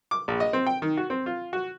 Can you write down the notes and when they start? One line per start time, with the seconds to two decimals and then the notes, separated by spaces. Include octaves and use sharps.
0.11 D6
0.28 A#1
0.40 D#5
0.53 C4
0.66 G5
0.82 D#3
0.97 F#4
1.10 C4
1.26 F4
1.53 F#4